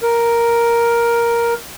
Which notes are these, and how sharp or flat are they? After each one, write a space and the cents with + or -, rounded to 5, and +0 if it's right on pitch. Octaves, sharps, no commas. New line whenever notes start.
A#4 +5